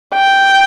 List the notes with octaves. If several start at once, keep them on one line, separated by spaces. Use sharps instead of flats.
G5